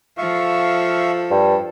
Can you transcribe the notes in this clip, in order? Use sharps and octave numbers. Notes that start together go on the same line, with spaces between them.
F3 A4 E5 F5 C#6
G2